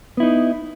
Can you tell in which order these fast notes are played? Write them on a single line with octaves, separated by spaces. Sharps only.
B3 E4 D#4